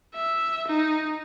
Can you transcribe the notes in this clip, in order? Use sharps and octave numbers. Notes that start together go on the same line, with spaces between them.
E5
D#4